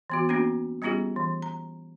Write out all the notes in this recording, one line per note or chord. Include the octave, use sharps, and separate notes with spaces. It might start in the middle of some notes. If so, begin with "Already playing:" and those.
E3 B3 F#4
A#3 B3 C#4 D4 F#4
G3 B3 C#4 F4 G4 G#4
E3
A#5